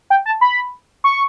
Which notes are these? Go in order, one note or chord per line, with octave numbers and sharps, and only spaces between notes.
G5
A5
B5
C#6